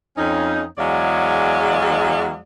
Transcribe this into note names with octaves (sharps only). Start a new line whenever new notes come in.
F2 C#4 D#4
E2 F#3 G#3 C#5 D5 F5